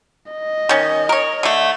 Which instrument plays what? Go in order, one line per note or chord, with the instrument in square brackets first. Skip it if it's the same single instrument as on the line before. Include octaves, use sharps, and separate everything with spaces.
[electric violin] D#5
[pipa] D#3 C#4
A#4 C#5
D3 A3